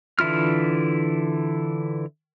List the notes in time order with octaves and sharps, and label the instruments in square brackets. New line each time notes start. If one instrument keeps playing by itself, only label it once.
[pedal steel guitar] D3 E3 E4 F4 F6